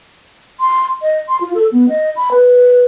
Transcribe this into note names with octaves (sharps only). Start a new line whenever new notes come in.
C6
D#5
C6
F4
A4
B3
D#5
B5
B4